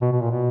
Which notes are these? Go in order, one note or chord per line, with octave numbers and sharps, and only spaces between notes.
B2
B2
A#2
B2